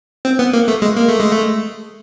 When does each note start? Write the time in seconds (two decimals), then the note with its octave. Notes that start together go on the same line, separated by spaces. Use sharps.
0.25 C4
0.39 B3
0.53 A#3
0.68 A3
0.82 G#3
0.97 A#3
1.08 A3
1.20 G#3
1.31 A3